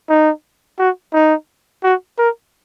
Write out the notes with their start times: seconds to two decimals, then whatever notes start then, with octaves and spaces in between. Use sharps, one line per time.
0.09 D#4
0.79 F#4
1.13 D#4
1.83 F#4
2.18 A#4